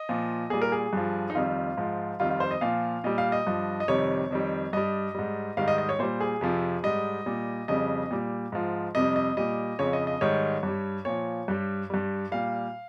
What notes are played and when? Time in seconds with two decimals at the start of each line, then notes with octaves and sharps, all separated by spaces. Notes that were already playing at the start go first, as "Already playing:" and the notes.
Already playing: D#5
0.09 A#2 F3
0.50 A#2 G3 G#4
0.62 A#4
0.72 G#4
0.93 G2 F3
1.30 D#4
1.35 F2 D#3 G3 F4
1.77 G#2 F3
2.20 F2 D#3 G3 F4
2.30 F4
2.40 C5
2.51 D#5
2.61 A#2 F3 F5
3.04 A#2 G3 D#5
3.18 F5
3.32 D#5
3.47 G2 F3
3.80 D#5
3.88 F2 C3 D#3 G3 C#5
4.31 F2 D#3 G3
4.73 G2 G3 D#5
5.15 G#2 G3
5.57 G#2 D#3 G3 F5
5.68 D#5
5.78 D#5
5.89 C#5
5.99 A#2 G3 C5
6.21 G#4
6.41 F2 C3 F3
6.84 G#2 G3 D#5
7.26 A#2 G3
7.68 F2 C#3 G3 D#5
8.11 A#2 G3
8.52 G#2 F3
8.95 F2 C3 G3 D#5
9.16 D#5
9.37 A#2 G3 D#5
9.79 F2 C#3 F3 C#5
9.93 D#5
10.07 D#5
10.21 G#2 D#3 G3 C#5
10.63 G2 G3
11.05 A#2 F3 C#5
11.48 G2 G3
11.90 G2 G3
12.32 A#2 G3 F5